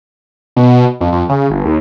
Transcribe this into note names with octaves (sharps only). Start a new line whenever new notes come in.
B2
F2
F2
C#3
G1
D#2